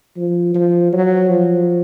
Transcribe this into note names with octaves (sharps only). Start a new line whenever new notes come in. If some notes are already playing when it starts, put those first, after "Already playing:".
F3
F3
F#3
F3